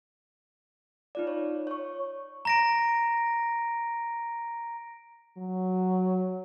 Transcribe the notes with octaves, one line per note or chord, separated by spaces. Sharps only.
D#4 F4 D5
C#5
C#5 C#6
A#5 A#6 D7
F#3